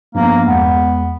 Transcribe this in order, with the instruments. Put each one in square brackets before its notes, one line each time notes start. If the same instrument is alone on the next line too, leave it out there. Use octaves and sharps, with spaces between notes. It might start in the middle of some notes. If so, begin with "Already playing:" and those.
[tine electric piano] G2 F3 B3 [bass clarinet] A#3
[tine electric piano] E2 G#3 [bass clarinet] B3